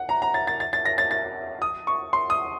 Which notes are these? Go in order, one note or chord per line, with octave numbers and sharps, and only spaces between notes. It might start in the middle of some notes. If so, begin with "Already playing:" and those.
Already playing: F#5
A#5
A#5
A6
A6
A6
A6
A#6
A6
A6
D#6
C#6
C6
D#6